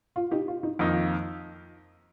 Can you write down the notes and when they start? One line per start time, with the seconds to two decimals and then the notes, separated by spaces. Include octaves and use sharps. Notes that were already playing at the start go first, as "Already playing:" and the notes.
0.16 F4
0.31 D#4 G4
0.48 F4
0.63 D#4
0.79 F2 D#3 A#3 D#4 F4
0.91 F4